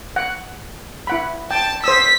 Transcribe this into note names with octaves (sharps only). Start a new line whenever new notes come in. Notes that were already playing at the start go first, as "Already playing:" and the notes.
F#5
E4 F#5 B5
G5 A5
C5 D#6 E6 B6